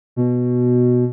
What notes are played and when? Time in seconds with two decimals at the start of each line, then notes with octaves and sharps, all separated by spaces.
0.16 B2